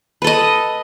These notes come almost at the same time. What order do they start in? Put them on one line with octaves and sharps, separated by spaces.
B4 A4 D#5